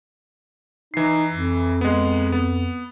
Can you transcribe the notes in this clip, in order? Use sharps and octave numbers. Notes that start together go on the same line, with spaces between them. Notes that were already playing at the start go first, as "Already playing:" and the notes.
E3 D#4 C7
F2
G#3 B3
B3